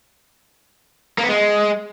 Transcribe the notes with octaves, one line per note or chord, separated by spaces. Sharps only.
A#3
B3
G#3